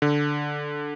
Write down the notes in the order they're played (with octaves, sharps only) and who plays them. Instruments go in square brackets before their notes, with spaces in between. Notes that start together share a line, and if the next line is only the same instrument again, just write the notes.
[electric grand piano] D3